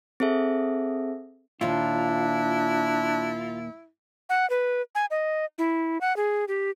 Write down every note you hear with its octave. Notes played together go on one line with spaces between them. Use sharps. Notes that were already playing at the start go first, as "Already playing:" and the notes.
C4 G#4 A4 E5
D#2 A#2 D4 E4 F4
F#5
B4
G#5
D#5
E4
F#5
G#4
G4